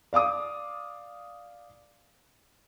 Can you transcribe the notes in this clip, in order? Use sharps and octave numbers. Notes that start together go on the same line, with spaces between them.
D5 F5 D6 D#6